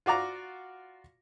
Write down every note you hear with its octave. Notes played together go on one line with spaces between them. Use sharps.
F4 F#4 D5 A#5